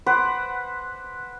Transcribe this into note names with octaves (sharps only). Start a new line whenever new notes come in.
B4 C5 F#5 D6